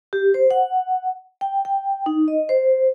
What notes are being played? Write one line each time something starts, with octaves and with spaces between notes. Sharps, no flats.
G4
C5
F#5
G5
G5
D#4
D#5
C5